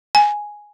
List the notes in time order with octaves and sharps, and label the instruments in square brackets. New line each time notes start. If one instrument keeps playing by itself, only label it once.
[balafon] G#5